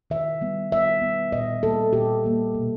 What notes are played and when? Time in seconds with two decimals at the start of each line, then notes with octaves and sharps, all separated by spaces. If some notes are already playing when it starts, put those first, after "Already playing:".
0.10 D#3 E5
0.41 G3 B3
0.72 D#3 E5
1.01 G3 B3
1.32 A#2 D#5
1.63 G3 A#3 A4
1.93 A#2 G4
2.24 G3 A#3
2.55 B2